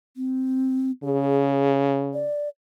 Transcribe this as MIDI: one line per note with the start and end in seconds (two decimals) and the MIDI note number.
0.17 0.91 60
1.04 2.27 49
1.04 1.73 68
2.14 2.49 74